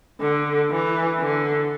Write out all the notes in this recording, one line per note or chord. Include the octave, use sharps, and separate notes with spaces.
D3
E3
D3